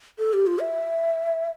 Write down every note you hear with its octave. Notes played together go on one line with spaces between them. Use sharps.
A4
G4
F4
E5